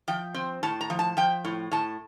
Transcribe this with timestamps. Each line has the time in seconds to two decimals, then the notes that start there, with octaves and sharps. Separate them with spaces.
0.08 F3 G5
0.34 C4
0.63 A2 A5
0.81 A#5
0.90 F3
0.99 A5
1.17 F3 G5
1.44 A2
1.71 A2 A5